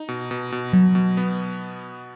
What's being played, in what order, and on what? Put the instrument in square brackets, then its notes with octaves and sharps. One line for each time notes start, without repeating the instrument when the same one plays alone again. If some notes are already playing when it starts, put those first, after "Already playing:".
Already playing: [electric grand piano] D#4
B2
B2
B2
[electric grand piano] B2 [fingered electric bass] F#3
[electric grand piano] B2
B3